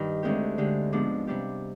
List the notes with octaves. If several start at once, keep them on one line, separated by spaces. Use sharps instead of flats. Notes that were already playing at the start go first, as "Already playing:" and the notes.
Already playing: G2 D#3 G3
D2 D3 G#3 C4 G4
D3 G#3 D4 G4
G#2 F3 B3 D4
C3 G3 D4 G4